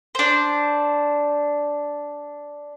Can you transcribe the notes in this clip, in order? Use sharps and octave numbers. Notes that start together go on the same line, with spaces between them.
D4 C5